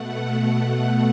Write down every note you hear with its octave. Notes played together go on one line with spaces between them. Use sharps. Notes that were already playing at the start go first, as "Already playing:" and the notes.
Already playing: B2 A3 F#5
F#5